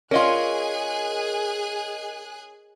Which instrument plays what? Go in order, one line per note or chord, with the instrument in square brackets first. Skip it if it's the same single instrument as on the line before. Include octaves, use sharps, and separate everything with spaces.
[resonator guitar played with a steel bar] C#4 F4 [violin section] G#4 G#5 F#6 [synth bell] A#4 D#5